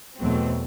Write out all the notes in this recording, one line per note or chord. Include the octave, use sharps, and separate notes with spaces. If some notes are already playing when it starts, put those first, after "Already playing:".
E2 B2 F#3 A3 C4